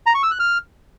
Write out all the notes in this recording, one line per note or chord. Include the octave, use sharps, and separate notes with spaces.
A#5
C#6
E6
F#6
F6